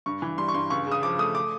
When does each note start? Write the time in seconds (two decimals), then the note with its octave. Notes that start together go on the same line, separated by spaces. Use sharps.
0.06 G2 C#6
0.22 E3
0.38 G3 C6
0.48 C#6
0.54 G2 C6
0.70 C#2 C#6
0.87 C#3 D#6
1.03 F3 D6
1.19 A3 D#6
1.35 D6